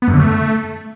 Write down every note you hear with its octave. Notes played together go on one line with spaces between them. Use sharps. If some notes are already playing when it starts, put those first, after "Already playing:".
B3
F#2
D3
A3